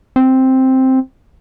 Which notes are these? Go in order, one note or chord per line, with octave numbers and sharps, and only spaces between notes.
C4